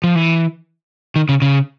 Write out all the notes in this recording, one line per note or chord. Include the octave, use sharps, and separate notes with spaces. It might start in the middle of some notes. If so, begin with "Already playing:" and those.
F3
E3
D#3
C#3
C#3